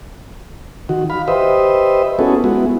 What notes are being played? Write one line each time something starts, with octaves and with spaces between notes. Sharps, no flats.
D#3 F#4
F5 B5
G4 B4 C5 D#5 E5
B3 C#4 E4 F#4 G#4 A4
G#3 B3 E4 F#4